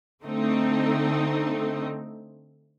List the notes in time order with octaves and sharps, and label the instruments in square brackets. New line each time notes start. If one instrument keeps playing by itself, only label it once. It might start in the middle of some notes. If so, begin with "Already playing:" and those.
[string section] D3 A3 C4 D#4